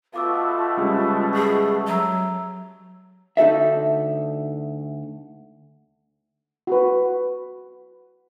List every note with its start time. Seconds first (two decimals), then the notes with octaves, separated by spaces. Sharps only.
0.14 B2 A3 F4 F5 D6 E6
0.77 C#3 G3 G#3
1.33 G#4 C#6
1.87 F#3 E5 A#5 E6
3.37 D2 D#4 F#4 A4 E5
6.67 F#4 B4